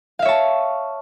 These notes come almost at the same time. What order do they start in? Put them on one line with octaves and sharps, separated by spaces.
F5 E5 C#5 A5